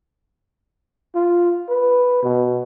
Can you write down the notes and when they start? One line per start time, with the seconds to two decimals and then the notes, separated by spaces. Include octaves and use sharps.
1.15 F4
1.69 B4
2.23 B2